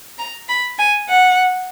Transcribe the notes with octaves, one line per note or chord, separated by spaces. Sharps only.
A#5
B5
G#5
F#5